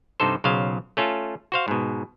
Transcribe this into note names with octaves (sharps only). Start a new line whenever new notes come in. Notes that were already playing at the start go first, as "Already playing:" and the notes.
G2 C3 D#4 A4 C5
B1 C#3 F#3 C5 F5
A3 C#4 F4 A4
F#4 C5 F5
G#2 B2